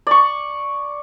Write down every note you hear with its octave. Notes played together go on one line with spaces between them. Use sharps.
D5 C#6